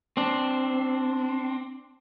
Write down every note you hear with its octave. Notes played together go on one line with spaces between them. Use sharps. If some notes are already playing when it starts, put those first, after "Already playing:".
C4 D4